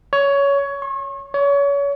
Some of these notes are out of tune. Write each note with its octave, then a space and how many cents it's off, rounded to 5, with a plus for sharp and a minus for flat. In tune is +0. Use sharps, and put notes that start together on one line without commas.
C#5 +15
C#6 -40
C#5 +30